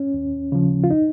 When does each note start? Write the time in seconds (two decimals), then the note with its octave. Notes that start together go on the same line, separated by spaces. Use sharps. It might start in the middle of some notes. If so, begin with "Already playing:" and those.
Already playing: C#4
0.14 D#2
0.52 C#3 F3
0.84 F4
0.91 D#4